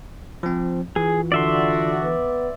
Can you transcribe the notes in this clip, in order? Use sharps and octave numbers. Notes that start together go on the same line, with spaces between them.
F3 C4
E3 F4 G#4
D3 F#4 D5 E5 C6
B3